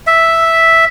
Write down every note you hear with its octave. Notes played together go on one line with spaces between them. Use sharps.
E5